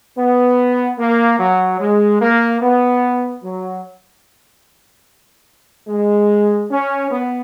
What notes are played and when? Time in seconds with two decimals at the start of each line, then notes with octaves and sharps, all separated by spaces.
0.18 B3
0.98 A#3
1.39 F#3
1.80 G#3
2.21 A#3
2.62 B3
3.43 F#3
5.88 G#3
6.71 C#4
7.11 B3